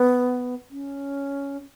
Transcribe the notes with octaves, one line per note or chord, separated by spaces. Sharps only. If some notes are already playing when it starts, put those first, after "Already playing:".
Already playing: B3
C#4